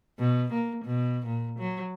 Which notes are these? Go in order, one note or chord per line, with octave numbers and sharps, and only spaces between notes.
B2
A#3
B2
A#2
F#3